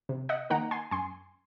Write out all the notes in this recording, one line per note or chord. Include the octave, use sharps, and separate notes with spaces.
C3
D#5 F#5
D#3 A#3 D#4 F#5 A#5
G#5 C6
F#2 G#5 C6